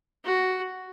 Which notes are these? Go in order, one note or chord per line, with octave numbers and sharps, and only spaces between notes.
F#4